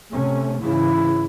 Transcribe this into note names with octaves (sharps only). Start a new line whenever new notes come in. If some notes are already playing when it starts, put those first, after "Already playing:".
C3 A3 C#4
G#2 C#3 E3 E4